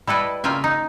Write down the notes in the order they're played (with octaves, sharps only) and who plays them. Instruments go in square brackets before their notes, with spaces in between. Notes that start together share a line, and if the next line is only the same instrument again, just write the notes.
[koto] G3 E4 A4 B4 D#5
C#3 A#3 F4 E5 G5 G#5
D#4